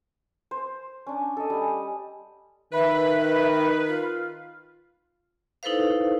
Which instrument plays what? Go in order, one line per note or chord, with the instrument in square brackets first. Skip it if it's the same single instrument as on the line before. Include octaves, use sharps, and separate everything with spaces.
[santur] C5
C#4 D4
A4 D#5
G3 G#5
[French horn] D#3 [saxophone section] B4 [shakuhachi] E5
[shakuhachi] F4
[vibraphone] D#4 E4 A4 B4 C5 F5